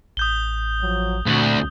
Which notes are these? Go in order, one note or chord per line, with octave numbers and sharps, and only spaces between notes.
A1 D#6 G6 G7
F3 F#3
D2 A#2 D3 C4 F#4